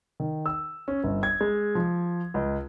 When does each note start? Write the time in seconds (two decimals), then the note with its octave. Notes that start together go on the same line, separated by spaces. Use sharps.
0.20 D#3
0.46 E6
0.88 C#4
1.04 G1
1.23 G#6
1.41 G#3
1.75 F3
2.34 C#2